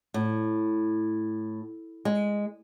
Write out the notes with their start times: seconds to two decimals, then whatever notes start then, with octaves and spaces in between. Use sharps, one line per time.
0.14 A2
2.05 G#3